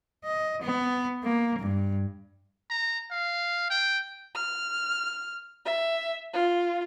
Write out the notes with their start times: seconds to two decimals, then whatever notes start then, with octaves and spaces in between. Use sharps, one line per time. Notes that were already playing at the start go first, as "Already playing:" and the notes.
0.24 D#5
0.62 B3
1.23 A#3
1.59 G2
2.70 A#5
3.11 F5
3.70 G5
4.35 F6
5.65 E5
6.33 F4